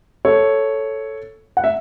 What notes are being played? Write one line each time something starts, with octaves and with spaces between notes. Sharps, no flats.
A4 C#5
F#5
E5